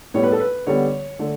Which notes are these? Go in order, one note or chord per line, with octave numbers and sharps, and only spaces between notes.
A2 G3 B3 C#5
B4
A4
B4
D3 G3 B3 C#5
D3 A3